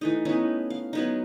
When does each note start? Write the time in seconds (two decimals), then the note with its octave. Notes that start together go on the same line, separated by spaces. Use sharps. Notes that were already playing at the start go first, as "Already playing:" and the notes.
0.01 E3 A3 D#4
0.25 B3 C#4 D#4 E4
0.70 F5
0.93 F#3 B3 D#4